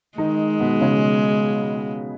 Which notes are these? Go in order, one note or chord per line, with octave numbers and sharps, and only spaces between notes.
D#3 G#3 D#4
B2 B3
C#3 C#4